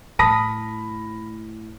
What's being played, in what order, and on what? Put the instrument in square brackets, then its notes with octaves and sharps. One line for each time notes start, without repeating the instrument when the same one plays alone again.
[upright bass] A2 [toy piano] A5 D#6 [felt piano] B5 A#6 B6